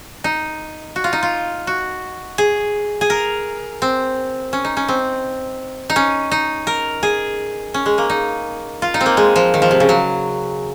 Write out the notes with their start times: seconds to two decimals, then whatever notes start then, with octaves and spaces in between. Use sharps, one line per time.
0.24 D#4
0.96 F#4
1.04 F4
1.13 D#4
1.23 F4
1.67 F#4
2.38 G#4
3.01 G#4
3.10 A#4
3.82 C4
4.53 C#4
4.64 D#4
4.77 C#4
4.88 C4
5.90 D#4
5.96 C#4
6.31 D#4
6.67 A#4
7.03 G#4
7.74 C#4
7.86 G#3
7.98 A#3
8.10 D#4
8.82 F4
8.94 D#4
9.01 C4
9.06 A#3
9.17 G#3
9.36 F3
9.54 D#3
9.62 F3
9.71 C3
9.80 C#3
9.89 F#3